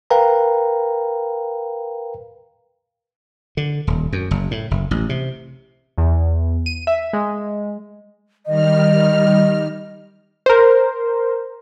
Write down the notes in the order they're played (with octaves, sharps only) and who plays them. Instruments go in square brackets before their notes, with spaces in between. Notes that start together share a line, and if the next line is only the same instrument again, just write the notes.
[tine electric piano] A#4 B4 F5 G5 A#5
[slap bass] D3
D#1
F#2
F#1
A2
F#1
A1
C3
[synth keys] E2
D#7
E5
G#3
[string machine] D#3 G3 F6 [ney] D#5
[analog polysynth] A#4 C5